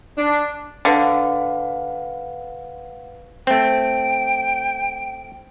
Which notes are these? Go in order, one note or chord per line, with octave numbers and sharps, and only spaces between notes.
D4
D3 B4 F5 F#5
A3 C4 G5